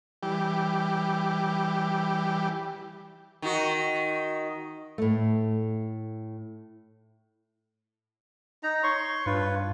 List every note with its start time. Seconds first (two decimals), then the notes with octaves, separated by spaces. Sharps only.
0.23 E3 G3 G4
3.42 D#3 F#4
4.98 A2 A3
8.63 D#4 A#5
8.83 C#5 C6 C#6
9.26 G2 F4 B4